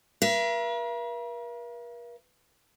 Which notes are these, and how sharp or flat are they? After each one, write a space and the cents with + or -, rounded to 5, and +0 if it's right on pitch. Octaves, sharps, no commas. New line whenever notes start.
A#4 +45 E5 +45